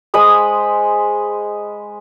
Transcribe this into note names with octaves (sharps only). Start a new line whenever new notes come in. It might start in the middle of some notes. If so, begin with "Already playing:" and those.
G#3 C5 B5 D#6